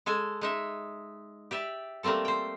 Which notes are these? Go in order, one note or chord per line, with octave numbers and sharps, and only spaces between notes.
G#3 A4 G#5
G#3 D#4 E5
G4 D5 E5
G3 A3 A#3 C4 A4
C5 G5